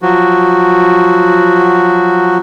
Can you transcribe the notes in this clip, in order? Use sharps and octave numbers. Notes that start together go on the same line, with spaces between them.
F3 F#3 F#4